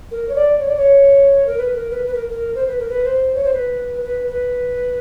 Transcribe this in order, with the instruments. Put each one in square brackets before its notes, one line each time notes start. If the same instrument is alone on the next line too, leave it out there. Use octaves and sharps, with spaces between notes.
[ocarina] A#4
C#5
D5
C#5
D5
C#5
A#4
B4
A#4
B4
B4
A#4
A#4
C5
B4
A#4
B4
C5
C#5
C5
B4
B4
B4